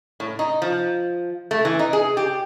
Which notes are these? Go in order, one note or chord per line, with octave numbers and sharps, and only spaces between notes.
A2
D#4
F3
A3
E3
D#4
G#4
G4